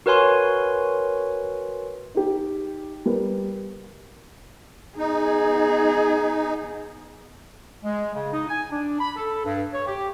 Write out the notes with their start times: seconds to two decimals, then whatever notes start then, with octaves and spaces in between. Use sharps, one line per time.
0.06 F#4 A#4 B4 C#5 G#5 C6
2.15 D#4 G4
3.05 G3 A#4 B4
4.98 B3 D#4 G#4
7.83 G#3
8.14 C#3
8.33 D#4
8.49 G#5
8.71 D4
9.00 B5
9.16 A4
9.45 G2
9.73 C#5
9.87 G4